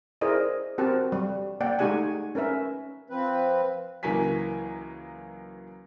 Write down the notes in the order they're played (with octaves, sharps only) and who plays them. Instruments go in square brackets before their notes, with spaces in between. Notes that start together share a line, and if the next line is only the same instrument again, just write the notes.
[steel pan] E4 G#4 A#4 C5 D5 D#5
C4 F#4 G4 A#4 A5
G3
A#3 D5 F#5 G5
G#3 A3 D#4 G4 F#5 G#5
C#4 A#4 B4 E5
[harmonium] F3 C4 B4
[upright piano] C#2 E3 F#3 A#3 G#5 B6